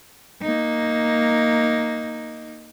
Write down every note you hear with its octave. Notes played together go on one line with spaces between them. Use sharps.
A#3 D#4